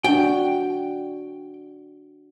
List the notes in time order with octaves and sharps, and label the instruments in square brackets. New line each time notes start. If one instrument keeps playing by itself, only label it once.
[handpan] D4 F#4 [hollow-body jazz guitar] G5